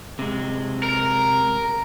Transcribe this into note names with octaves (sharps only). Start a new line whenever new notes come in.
C3 G#3
A#4